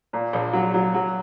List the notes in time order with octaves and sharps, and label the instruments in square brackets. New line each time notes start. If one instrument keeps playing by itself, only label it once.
[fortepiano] A#2
A#1
F#3
F#3
F#3